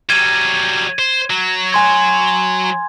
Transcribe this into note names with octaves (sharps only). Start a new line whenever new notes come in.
F#3 G3 G#6 D#7
C5
F#3
G#5 C6 G#6